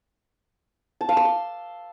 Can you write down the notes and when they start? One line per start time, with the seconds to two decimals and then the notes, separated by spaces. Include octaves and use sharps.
1.01 A5
1.09 F5
1.17 E6
1.25 C6